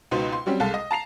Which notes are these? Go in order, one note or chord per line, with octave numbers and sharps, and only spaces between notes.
C#2 B2 D#4 B4 C5
C6
F#3 G3 C4 C#4 G4
C2 G#3 A4 F5
D#5
A5 A#5 C7 F7